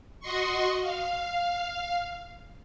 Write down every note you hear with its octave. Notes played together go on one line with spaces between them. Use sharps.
F#4 D#5 C6 C#6
F5